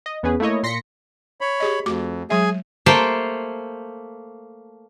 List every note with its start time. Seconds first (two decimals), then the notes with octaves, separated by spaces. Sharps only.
0.06 D#5
0.23 E2 B3 C#4 G#4 B4
0.40 A3 A#3 E4 C#5 D#5
0.63 A#2 C6 A#6 B6 C#7
1.41 C#5 B5
1.60 G4 G#4 D#5
1.86 F2 A3 F#4 D6
2.30 F#3 G#3 G#4 E5 G#5
2.86 A3 A#3 C5 G5 A5 C6